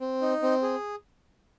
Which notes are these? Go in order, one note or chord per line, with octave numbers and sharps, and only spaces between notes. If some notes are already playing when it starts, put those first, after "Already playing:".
C4
D#4
C4
G#4